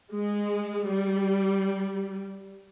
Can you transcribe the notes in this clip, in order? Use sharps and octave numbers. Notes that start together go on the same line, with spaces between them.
G#3
G3